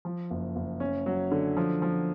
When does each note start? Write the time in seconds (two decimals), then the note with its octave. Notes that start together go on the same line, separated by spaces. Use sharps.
0.05 F3
0.31 F#1
0.56 F#1
0.80 C#4
1.06 F#3
1.32 D3
1.57 F3
1.82 F3